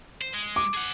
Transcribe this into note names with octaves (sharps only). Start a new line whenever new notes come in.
C5
G#3
D6
G#4 F#5